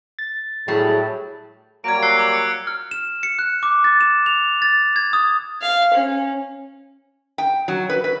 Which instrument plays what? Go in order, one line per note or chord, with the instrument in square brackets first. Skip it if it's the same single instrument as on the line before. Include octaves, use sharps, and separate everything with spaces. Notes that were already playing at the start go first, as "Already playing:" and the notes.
[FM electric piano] A6
[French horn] A2 [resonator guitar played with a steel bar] F#3 G3 [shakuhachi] G#4
[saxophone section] F#3 G3 A#3 [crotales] G#6 D7
[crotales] E6 F#6 C7
D6 C7 F#7
C#7
[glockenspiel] F6
E7
C#7
F#6
D6
A6
E7
F7
A6
G#6
D#6
[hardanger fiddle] F5
C#4
[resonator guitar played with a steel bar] G5
F#3
B4
B4